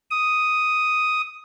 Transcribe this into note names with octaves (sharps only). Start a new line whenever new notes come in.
D#6